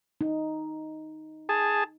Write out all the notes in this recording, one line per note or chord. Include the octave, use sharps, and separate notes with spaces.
D#4
G#4 A5